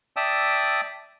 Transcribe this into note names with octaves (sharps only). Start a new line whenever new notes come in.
D5 E5 G5 A5 D#6 E6